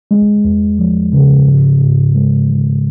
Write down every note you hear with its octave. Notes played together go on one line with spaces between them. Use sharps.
G#3
E2
F3
C#3
G#2
G#2
G#3
D#3